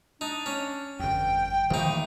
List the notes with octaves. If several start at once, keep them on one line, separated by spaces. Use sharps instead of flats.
D4 D#4
C#4
G1 F2 G5
A#1 D#3 E3 A3 A#3 D#4